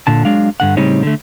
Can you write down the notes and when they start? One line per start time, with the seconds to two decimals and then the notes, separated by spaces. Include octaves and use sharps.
0.07 A#2 D3 A5
0.25 F#3 G#3 D4 F5
0.60 G2 D3 F#5
0.77 A2 C#3 G3 C4 D#4 C#5
1.03 D3 A3